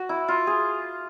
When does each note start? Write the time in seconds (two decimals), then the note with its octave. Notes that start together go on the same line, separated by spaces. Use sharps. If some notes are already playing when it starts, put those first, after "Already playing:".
Already playing: F#4
0.09 E4
0.28 F4
0.47 G#4